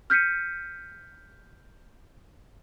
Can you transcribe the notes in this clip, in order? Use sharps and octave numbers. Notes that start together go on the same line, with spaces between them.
F6 G6 B6 C#7 D#7